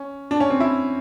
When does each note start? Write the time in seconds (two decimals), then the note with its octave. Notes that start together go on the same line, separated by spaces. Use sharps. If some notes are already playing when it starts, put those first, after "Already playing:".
Already playing: C#4
0.31 D4
0.40 C#4
0.50 C4
0.60 E4